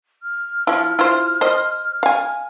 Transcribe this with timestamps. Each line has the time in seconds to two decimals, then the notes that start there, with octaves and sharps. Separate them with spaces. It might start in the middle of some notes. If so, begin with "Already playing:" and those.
0.23 F6
0.67 F3 E4
0.99 E4 F4 C5
1.41 C5 D#5
2.03 F5 G#5